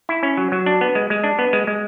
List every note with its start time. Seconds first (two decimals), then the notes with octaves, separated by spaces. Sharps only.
0.09 E4
0.23 C#4
0.37 F#3
0.52 F#3
0.66 D4
0.81 B3
0.95 G#3
1.10 G#3
1.24 D4
1.39 B3
1.53 G#3
1.67 G#3